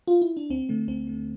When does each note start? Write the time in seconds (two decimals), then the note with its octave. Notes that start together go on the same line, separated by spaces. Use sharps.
0.08 F4
0.22 E4
0.37 D4
0.50 D2 C4
0.69 D3 A3
0.88 D2 C4
1.07 D3 A3